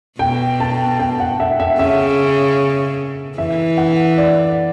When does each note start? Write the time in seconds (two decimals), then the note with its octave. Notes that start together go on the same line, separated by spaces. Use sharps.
0.19 B2 G5
0.60 A5
0.99 G5
1.20 F#5
1.40 E5
1.60 E5
1.79 C#3 E5
3.38 E3 E5
3.77 F#5
4.18 D5